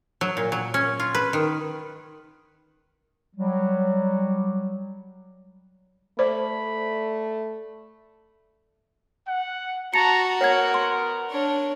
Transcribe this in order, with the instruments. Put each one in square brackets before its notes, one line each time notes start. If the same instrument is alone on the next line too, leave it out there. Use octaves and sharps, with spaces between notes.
[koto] F#3
A#2
F#3
C#4
F4
B4
D#3
[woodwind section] F#3 G3
[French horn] A3 [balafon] C5 [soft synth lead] D5 [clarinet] B5
[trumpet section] F#5
[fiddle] F#4 [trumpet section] A5 A#5 [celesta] C#7
[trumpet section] B3 A#4 [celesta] C#5 F#5 G#6
[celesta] C6
[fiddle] D4 C#5